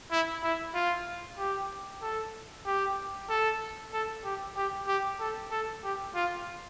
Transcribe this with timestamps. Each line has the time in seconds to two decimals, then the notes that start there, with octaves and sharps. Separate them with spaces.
0.11 E4
0.43 E4
0.75 F4
1.38 G4
2.02 A4
2.66 G4
3.30 A4
3.93 A4
4.25 G4
4.57 G4
4.88 G4
5.20 A4
5.52 A4
5.84 G4
6.15 F4